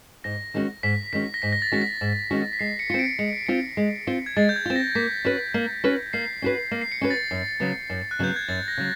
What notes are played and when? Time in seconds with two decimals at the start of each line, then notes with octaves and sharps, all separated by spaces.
0.24 G#2 A#6
0.54 D#3 G#3 C#4 F#4
0.83 G#2 B6
1.13 D#3 G#3 C#4 F#4 B6
1.34 A#6
1.42 G#2 B6
1.52 A#6
1.62 A6
1.72 D#3 G#3 C#4 F#4
1.82 B6
2.01 G#2
2.31 D#3 G#3 C#4 F#4
2.53 B6
2.59 G#3 C7
2.79 C#7
2.90 C4 F4 C#7
2.99 D7
3.19 G#3 C#7
3.33 C7
3.46 C4 F4 C#7
3.77 G#3
4.07 C4 F4
4.26 G#6
4.37 G#3 A6
4.49 G6
4.56 G#6
4.65 C4 F4
4.76 A#6
4.95 A#3 B6
5.25 C#4 F#4 B4
5.54 A#3
5.84 C#4 F#4 B4
6.13 A#3 C7
6.42 C#4 F#4 B4
6.71 A#3
6.81 C7
6.92 C#7
7.01 C#4 F#4 B4
7.11 A6
7.31 F#2
7.60 C#3 F#3 B3
7.90 F#2
8.11 F#6
8.19 C#3 F#3 B3 G6
8.36 G#6
8.48 F#2 A6
8.68 A#6
8.77 C#3 F#3